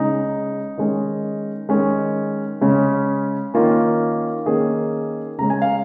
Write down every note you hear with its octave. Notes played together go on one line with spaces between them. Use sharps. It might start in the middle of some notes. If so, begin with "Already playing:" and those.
Already playing: C#3 G#3 C#4 D#4
D#3 G#3 C#4
D#3 G#3 C#4
C#3 G#3 C#4
D#3 A#3 C#4 F4
D#3 A#3 C#4 G#4
C#3 G#3 C#4 A#5
G#5
F5